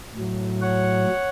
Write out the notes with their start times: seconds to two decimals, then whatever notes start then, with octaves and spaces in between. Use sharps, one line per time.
0.15 A2 F#3
0.62 C#5 F#5